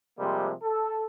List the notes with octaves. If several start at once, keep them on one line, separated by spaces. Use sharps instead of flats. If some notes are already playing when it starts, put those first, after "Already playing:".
C3 F3 G3 G#3 A#3
A4